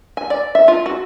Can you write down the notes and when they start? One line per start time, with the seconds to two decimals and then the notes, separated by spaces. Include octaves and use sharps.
0.17 G#5
0.30 D5
0.55 E5
0.68 F4
0.86 F#4